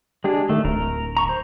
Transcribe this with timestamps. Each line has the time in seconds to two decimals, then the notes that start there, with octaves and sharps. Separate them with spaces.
0.24 G#3 D4 G4 G#4
0.49 D#3 A3
0.65 D1 A#4
1.17 A#5 C#6
1.29 C5